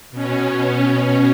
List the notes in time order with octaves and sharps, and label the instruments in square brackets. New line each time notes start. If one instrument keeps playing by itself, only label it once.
[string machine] B2 C#4